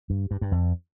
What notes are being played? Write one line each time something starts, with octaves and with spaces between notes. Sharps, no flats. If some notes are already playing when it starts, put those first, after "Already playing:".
G2
G2
G2
F2